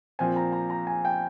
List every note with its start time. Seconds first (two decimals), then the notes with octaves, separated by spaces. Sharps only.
0.19 A#2 F3 C4 G#5
0.36 A#5
0.52 A#5
0.70 A#5
0.87 G#5
1.05 G5